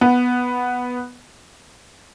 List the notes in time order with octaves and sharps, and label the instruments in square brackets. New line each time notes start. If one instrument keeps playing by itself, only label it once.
[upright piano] B3